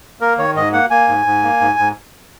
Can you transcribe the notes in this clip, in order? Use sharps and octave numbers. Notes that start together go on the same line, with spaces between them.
A#3 A#4
D#3 C#5
G#2 D#5
A#3 F#5
A#3 G#5
G#2
G#2
A#3
G#2
G#2